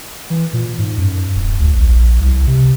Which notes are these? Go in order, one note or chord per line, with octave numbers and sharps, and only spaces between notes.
E3
A#2
G#2
F#2
D1
D2
A#1
C2
C3